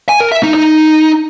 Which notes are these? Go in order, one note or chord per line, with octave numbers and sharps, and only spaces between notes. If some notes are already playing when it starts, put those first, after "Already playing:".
G#5
A#4
E5
D#4
D#4